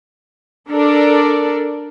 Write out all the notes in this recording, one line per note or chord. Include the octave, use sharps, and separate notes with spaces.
D4 A4 A#4 D5